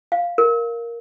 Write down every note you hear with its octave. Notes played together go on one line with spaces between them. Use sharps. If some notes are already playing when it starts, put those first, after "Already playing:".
F5
A#4